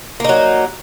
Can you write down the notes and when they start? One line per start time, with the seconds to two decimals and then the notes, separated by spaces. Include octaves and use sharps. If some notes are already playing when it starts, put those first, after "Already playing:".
0.20 A#3
0.24 D#4
0.29 F#3